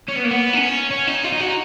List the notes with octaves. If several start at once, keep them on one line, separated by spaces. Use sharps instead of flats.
C#4
B3
A#3
B3
D#4
C#4
C#4
D#4
F4
D#4
F#4
D#4